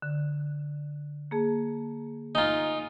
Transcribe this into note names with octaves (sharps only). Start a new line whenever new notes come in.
D3
A#3 G#4 A5
D#4 F4 G#5 A#5